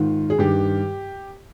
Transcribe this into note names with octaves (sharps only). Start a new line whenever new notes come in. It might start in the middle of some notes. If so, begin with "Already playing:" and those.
Already playing: G#2 D#3 F4
G#4
G2 D#3 G4